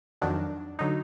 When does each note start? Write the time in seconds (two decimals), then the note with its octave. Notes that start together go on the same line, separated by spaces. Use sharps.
0.22 F2 D#3 F#3 D4
0.79 D3 F#3 D#4